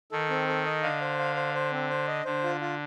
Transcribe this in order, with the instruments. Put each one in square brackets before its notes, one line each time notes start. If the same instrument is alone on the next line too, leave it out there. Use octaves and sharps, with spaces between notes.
[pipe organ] D#3 [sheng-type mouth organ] A4
[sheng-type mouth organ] C4
A4
D#5
[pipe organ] D3 [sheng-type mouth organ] F5
[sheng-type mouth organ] C5
F5
C5
C5
C4
C5
D#5
[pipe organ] D3 [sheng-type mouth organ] C5
[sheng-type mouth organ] F4
F4